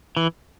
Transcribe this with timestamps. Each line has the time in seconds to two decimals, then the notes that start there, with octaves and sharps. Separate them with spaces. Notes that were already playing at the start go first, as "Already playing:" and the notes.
0.17 E3